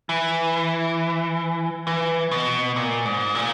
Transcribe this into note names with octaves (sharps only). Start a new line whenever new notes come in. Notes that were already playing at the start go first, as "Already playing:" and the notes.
E3
E3
B2
A#2
G#2
A#2